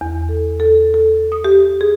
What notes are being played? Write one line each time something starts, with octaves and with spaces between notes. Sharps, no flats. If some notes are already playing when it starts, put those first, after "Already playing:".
E2
A4
A4
A4
D#6
G4
G#4